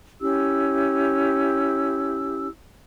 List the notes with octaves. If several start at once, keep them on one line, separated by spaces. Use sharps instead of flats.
C#4 E4 G4 E6